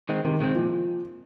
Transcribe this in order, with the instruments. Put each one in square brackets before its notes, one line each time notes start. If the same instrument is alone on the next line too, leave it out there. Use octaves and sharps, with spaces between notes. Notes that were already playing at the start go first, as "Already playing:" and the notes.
[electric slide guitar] D#3 G#3 C4
[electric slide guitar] C3 [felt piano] D#3
[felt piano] C3 [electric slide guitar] D#3 G#3 C4
[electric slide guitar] A#2 [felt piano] F3